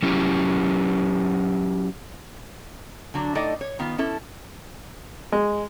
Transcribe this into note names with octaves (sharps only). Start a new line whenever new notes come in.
F#3 C#4 E4 G4
D3 F#3 D4
A2 D#4 A4 D5 D#5
C#5
D#3 B3 F4
C#4 E4 A4
G#3